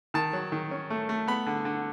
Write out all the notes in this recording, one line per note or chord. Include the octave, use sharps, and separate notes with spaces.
D#3 A5
F#3
D#3
C#4
A3
A3
B3 B5
D3
D3